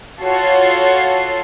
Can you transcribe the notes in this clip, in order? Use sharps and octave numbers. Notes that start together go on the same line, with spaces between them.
F4 F#4 A4 C#5 C7